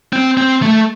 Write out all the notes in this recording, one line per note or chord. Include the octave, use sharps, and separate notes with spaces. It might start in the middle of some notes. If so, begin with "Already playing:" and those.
C4
C4
A3